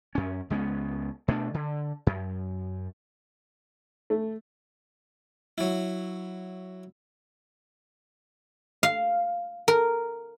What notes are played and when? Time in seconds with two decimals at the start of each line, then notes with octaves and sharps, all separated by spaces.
0.15 F#2 C#4
0.50 C#2 G#3 B3 C#4
1.28 B2 A3 A#3 D4
1.54 D3
2.07 F#2
4.10 A3
5.58 F#3 E4
8.83 F5
9.68 A#4